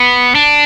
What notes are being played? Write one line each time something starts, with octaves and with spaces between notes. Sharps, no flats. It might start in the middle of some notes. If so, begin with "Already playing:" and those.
Already playing: B3
D4